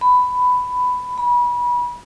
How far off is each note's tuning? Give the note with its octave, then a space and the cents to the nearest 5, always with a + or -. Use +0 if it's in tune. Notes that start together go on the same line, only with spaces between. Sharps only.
B5 +10
B5 -30